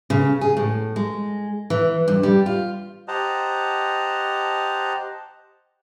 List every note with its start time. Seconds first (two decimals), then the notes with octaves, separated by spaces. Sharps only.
0.10 C#3
0.41 G#4
0.57 A2
0.96 G#3
1.70 E3
2.08 G2
2.23 G3
2.46 F4
3.08 G4 C5 D#5 F#5 A5 A#5